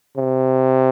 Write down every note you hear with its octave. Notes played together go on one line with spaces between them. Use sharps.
C3